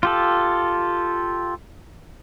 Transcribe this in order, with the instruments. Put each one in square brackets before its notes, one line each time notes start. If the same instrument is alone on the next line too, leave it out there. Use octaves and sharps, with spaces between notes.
[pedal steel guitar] F4 G4 A4